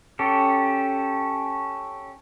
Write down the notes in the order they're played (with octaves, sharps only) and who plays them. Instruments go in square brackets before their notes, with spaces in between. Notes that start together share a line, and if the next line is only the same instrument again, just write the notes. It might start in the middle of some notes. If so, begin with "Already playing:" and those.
[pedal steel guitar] C#4 G4 A4